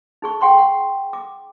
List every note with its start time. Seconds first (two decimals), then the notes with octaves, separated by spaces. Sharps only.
0.22 D#4 G#4 C#6
0.41 G#4 F#5 G5 C6 C#6
0.58 F#5
1.13 D6